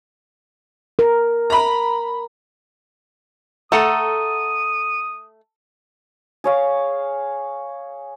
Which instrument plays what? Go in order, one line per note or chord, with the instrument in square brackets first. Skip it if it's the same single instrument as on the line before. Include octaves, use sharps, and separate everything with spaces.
[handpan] A#4
[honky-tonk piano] A#5 B5
[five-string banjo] A3 [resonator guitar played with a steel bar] A4 F#5 A#5 [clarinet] D#6
[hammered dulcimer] G#4 C#5 F5